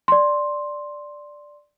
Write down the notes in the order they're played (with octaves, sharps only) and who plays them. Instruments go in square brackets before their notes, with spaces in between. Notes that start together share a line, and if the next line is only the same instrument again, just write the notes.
[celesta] D5 C6